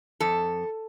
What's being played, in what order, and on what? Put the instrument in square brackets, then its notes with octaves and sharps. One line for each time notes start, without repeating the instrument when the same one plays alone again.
[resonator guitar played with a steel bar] F2 A4